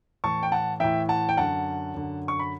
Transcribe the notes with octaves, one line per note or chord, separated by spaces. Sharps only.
A2 E3 A5 C#6
G5
F#5 A5
A2 E3 E5 G5
F#5 A5
G5
F#2 D3 F#5 A5
F#2 D3
C#6
B5